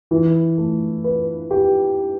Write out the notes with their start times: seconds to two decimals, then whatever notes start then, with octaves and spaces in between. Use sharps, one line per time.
0.11 E3
0.58 A3
1.04 B4
1.51 G4